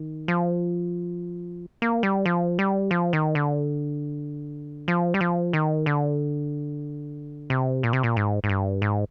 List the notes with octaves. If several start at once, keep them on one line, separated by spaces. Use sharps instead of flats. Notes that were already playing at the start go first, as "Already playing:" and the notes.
Already playing: D#3
F3
A#3
G3
F3
G3
F3
D#3
D3
F3
G3
F3
D#3
D3
C3
A#2
C3
A#2
G#2
G#2
G2
G#2